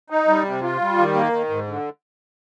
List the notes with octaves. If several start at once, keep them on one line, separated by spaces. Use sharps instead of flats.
D#4
G3
C3
F4
G3
D#3
A#3
D#3
G#2
D3